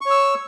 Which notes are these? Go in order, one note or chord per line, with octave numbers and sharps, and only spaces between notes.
C#5 C#6 E6